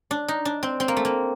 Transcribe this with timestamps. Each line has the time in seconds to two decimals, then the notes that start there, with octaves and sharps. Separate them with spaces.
0.11 D4
0.28 D#4
0.45 D4
0.63 C4
0.80 C4
0.88 A#3
0.97 A3
1.05 A#3